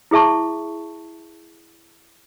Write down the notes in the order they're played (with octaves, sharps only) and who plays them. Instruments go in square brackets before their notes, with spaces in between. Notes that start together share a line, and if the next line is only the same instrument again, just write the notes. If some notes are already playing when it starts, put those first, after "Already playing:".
[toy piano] E4 G#4 E5 A5 C#6